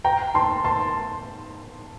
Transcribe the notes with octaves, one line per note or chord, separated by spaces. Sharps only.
G5 A#5
A5 C6
A5 C6